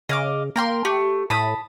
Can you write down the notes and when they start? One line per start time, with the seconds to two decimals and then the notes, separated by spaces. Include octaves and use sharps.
0.09 C#3 D#5 F5 D6
0.56 A#3 A#4 G5 C6
0.85 A3 G4
1.30 A2 A5 B5 D#6